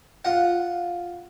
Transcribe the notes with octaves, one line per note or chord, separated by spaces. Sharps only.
F4 F#5